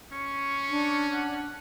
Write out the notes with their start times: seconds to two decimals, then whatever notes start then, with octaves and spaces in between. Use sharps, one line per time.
0.12 C#4 C#6
0.69 D4
1.13 F#5